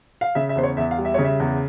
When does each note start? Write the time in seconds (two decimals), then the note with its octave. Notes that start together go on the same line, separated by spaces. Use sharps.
0.21 F5
0.35 C#3 E5
0.49 E5
0.56 E2 C5
0.63 C#5
0.77 E2 E5
0.91 F5
0.98 G3
1.05 E5
1.14 C#3 C#5
1.24 E5
1.40 E2